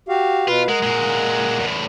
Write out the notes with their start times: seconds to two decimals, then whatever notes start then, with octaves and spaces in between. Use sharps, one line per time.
0.09 F#4 G4 F5
0.48 B2 F4 B4 F5
0.69 G#3 A#4 F#5
0.83 A#2 G#3
1.59 E2 A2